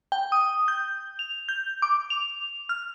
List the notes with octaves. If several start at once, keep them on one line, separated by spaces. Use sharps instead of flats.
G5
D#6
G6
F7
G6
D6
F7
F6